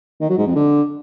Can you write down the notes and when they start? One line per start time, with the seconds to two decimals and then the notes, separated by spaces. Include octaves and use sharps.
0.21 D#3
0.29 F#3
0.38 G#2
0.47 F2
0.56 D3